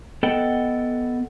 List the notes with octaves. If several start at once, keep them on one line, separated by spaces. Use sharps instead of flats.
B3 A4 D#5 F#5 G5